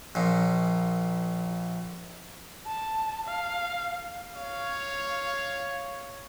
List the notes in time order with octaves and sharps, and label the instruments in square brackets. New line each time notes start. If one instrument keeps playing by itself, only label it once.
[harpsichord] A#1 A#2
[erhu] A5
F5
[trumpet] C#5 [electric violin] F5